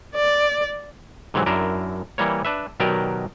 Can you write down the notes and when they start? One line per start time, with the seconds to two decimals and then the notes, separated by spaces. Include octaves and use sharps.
0.15 D5
1.34 G#2 C3 E3 F#3
1.46 F#2 D4 E4 A#4
2.18 E3 G3 A#3 C#5
2.45 D4 B4 E5
2.80 B2 D#3 F#3 G4 A#4 D5